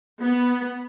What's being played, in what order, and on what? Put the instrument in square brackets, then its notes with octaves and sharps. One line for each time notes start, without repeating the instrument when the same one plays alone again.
[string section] B3